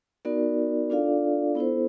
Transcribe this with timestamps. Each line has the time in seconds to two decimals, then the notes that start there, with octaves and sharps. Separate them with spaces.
0.25 B3 D#4 F#4 A#4 D5
0.90 D4 F4 A4 D5 F5
1.55 B3 E4 A4 C5